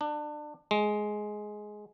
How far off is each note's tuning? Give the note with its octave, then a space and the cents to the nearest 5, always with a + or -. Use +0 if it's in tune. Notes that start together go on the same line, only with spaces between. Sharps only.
D4 +25
G#3 +10